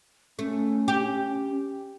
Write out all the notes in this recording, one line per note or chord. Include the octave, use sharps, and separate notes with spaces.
A3 C#4
G4